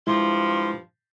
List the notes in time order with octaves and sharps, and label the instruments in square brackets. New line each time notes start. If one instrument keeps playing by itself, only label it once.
[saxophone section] G2 F3 [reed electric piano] G#3 E4 [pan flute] C6